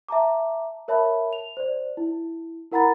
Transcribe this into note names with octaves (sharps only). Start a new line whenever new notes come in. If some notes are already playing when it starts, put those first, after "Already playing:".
E5 A5 A#5 D6
A#4 C#5 E5 A5 B5
F7
C5 D5
E4
E4 A#4 F#5 A#5 B5 A6